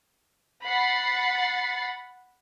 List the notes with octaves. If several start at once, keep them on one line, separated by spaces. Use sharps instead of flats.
F#5 B5 A6 C7